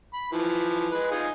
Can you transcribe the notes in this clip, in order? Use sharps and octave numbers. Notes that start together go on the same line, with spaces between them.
B5
E3 F3
G#3 B4
D#4 F4 G#5